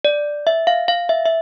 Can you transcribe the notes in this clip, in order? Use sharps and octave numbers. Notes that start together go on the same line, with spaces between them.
D5
E5
F5
F5
E5
E5